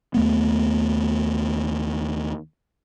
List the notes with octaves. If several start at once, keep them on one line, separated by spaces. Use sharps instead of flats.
D#2 A3 B3